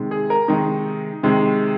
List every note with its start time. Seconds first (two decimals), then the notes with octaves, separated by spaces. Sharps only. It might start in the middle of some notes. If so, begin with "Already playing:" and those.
Already playing: C3 D#3 G#3
0.11 G#4
0.30 A#4
0.48 C3 D#3 G#3 D#4
1.23 C3 D#3 G#3